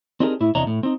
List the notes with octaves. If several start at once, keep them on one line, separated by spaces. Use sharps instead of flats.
C4 D4 D#4 G4 G#4 A#4
A2 E4
E2 C3 D4 C#5 D#5 A#5
A2
C4 D#4